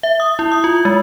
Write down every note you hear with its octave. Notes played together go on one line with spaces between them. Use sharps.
E5
D#6
E4
D#6
F4
G#3